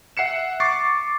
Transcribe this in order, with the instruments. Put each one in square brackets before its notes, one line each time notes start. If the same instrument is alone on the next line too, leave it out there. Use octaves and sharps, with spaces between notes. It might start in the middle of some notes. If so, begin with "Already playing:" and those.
[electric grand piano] E5 F#5 C7 C#7 E7
C#6 D6 A6 C7